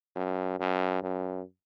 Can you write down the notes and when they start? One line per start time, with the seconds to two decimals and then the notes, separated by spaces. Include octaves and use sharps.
0.16 F#2
0.60 F#2
1.02 F#2